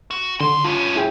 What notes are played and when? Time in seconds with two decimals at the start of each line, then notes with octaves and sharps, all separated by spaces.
0.11 F#4
0.40 F#2 D3 C6
0.64 G2 C#4 F4
0.95 E4 G#4 G5